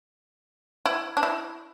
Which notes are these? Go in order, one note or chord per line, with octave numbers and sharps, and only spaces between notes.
E4
D4
E4